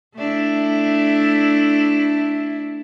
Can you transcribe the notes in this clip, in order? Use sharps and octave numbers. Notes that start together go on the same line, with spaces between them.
A3 D4 E4